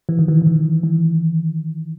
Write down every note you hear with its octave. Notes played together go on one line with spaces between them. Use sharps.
E3
D#3
E3
E3
D#3
E3